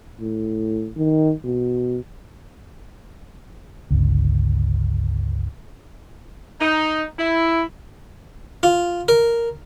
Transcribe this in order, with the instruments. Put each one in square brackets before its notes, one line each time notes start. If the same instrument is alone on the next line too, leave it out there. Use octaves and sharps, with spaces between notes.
[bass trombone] A2
D#3
B2
[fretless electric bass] G1 C#2
[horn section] D#4
E4
[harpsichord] F4
A#4